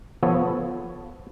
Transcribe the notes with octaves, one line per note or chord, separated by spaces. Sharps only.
F3 B3 A4 C#5